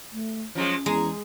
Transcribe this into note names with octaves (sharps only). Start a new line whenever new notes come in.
A3
F3 F#3 G#3 C#4
E2 G#3 G#4 A#5